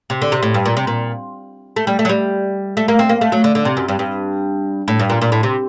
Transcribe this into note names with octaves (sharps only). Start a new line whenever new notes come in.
C3
D3
C3
A2
G2
A#2
C3
A#2
A3
G3
A3
F#3
G3
A3
A#3
C4
A#3
A3
F#3
D3
D3
C3
F#2
G2
G2
A2
G2
A#2
A#2
A2
C3